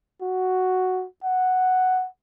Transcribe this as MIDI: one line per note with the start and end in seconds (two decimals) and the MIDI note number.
0.22 1.06 66
1.24 2.07 78